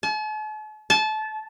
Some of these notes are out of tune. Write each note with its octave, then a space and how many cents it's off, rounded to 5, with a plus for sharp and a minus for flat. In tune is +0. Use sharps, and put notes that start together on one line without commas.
A5 -45
A5 -25